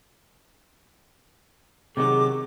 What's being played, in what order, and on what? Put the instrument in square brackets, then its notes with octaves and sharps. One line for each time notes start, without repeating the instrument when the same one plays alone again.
[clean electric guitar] C3 D#3 F#3 [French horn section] G#4 [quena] D6